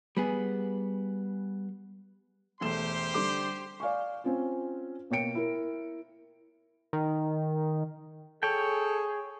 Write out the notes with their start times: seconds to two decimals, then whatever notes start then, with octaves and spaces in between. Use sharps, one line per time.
0.17 G3 B3 G#4
2.61 E1 A3 G4 C5 C6 E7
3.14 D3 G3 D6
3.80 D5 F5 G#5 C#6
4.24 C4 C#4 F4
5.10 B2 A#3 C#5 G5 C#7 D7
5.35 E4 A#4
6.93 D#3
8.43 G#4 A4 C#5 G5